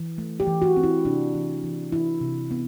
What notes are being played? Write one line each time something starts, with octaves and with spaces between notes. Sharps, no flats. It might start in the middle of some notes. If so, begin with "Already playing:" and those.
Already playing: E3
A3
G4
E3
F#4
C4
E4
C3 D4
E3
E3
E3 E4
C3
B3